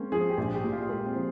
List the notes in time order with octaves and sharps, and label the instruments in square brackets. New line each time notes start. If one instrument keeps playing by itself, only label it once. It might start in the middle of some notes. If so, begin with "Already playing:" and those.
Already playing: [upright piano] G#3 [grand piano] A#3 C4 C#4
[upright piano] F3 [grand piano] G#4
[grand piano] G4
[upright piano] A#1 [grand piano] G#4
[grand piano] G4
[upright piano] A#2
[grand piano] F4
[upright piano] G#3 [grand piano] A#3
[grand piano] C4
[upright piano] F3